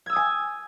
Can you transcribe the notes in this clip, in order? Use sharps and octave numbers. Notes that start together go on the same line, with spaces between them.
G#5 D#6 E6 G#6